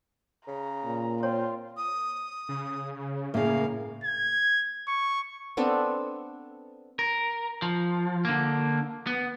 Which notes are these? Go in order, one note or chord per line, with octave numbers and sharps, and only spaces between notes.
C#3 A#5
A#2
C4 F4 C#5
D#6
C#3
A2 C#3 A#3 F5
G#6
C#6
B3 C4 D4 A4
A#4
F3
D3 A#3
B3